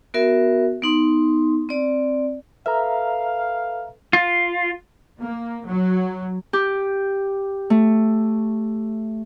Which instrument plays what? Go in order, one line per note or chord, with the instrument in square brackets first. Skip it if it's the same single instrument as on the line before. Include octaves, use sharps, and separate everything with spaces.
[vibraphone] B3 F#4 A#4 E5
B3 D#4 C6
C4 D5
[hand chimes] A4 B4 F6 [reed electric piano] E5 A#5 [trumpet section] F5
[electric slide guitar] F4
[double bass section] A#3
F#3
[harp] G4
A3